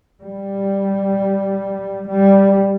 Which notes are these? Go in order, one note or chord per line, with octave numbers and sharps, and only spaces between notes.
G3
G3